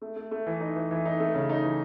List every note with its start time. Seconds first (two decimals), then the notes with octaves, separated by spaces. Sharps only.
0.02 A3
0.16 A3
0.31 A3
0.46 E3
0.60 D#4
0.76 E3
0.91 E3
1.05 D#4
1.20 A3
1.34 C#3
1.49 D#4
1.64 E3